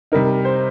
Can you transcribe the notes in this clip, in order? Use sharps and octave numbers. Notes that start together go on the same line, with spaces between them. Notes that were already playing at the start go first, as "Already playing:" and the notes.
C3 G3 D#4 A#4
C5